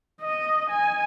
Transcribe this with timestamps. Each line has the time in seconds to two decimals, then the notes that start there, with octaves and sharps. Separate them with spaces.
0.21 D#5
0.70 G#5